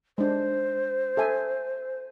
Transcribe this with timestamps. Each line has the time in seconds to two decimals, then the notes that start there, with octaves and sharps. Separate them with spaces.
0.18 G#3 D4 C5
1.17 A4 E5 G#5